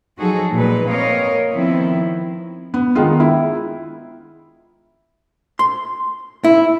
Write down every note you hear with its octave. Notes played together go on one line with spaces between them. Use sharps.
F3 F#3 D#4 F#4 G#4 A4
A#2 G#3 D#4 B4
A#3 C4 A#4 C#5 D#5 F5
D#3 F3 B3 C4 E4
B3
D#3 G#3 B3 F4
E4
C6
E4